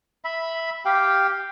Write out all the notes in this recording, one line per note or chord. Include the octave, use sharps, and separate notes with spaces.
E5 B5
G4 F5 G5